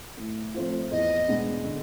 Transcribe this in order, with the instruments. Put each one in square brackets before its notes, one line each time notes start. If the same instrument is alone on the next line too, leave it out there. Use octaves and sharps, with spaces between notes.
[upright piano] A2
F3 A3 C4 F4
[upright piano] E2 [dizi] D#5
[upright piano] B2 G#3 B3 D4
D3